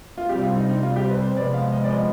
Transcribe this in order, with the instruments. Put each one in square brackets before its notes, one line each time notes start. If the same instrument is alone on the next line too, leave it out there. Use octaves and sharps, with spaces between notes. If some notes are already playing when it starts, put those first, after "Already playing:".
[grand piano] F4
[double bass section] C3 G3 C4 [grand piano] G4
[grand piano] F4
D#4
D#4
F4
G4
B4
C5
[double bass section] C3 F3 G#3 B3 [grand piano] D5
[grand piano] F5
D#5
D5
D#5